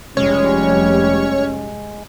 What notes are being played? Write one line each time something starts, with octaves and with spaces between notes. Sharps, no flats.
F1 G3 G#3 C#4 C#5